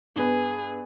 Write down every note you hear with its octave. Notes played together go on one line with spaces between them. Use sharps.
G2 B3 G#4 B4